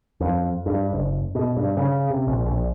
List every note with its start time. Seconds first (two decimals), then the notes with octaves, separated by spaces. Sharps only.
0.20 F2
0.66 G2
0.93 F#1
1.35 B2
1.57 G2
1.77 C#3
2.10 C3
2.27 A#1
2.46 A#1